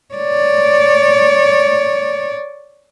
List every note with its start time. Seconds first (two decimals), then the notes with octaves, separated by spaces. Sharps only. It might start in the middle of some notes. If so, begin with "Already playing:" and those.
0.15 C#5 D5